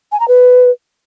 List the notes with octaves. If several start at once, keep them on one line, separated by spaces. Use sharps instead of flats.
G#5
A#5
B4